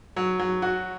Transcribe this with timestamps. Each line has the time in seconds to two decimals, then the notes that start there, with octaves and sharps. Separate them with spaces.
0.16 F#3
0.39 F#3
0.62 F#4